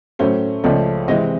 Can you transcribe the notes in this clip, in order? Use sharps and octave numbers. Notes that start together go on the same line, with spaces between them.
A2 F#3 A3 C#4 C5
C#2 C#3 F3 A3 C#4 D5
C3 E3 G#3 C4 D#5